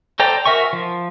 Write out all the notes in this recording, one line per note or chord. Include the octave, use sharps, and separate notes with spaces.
A4 C5 D5 G5 A#5
F#4 A#4 E5 G#5 C#6
F3